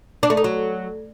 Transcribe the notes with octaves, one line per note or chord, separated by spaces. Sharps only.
D4
A3
D#4
F#3